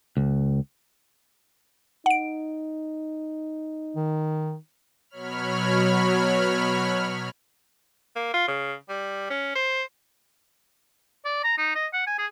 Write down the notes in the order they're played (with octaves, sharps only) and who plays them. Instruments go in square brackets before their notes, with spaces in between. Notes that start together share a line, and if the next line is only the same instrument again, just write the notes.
[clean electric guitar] C#2
[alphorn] D#4 [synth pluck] F#5 D7
[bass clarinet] D#3
[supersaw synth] B2 F#3 C#5 B5 F6
[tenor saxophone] A#3
F4
C#3
G3
C#4
C5
[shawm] D5
A#5
D#4
D#5
F#5
G#5
G#4